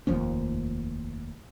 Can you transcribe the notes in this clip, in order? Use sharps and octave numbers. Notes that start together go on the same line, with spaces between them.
F1 D#2 F3 C#4